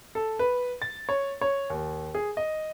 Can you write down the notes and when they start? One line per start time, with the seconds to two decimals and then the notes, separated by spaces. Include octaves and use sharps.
0.15 A4
0.39 B4
0.82 A6
1.09 C#5
1.41 C#5
1.70 D#2
2.15 G#4
2.37 D#5